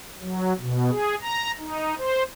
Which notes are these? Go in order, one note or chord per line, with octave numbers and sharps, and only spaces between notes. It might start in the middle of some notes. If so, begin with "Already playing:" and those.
F#3
B2
G#4
A#5
D#4
C5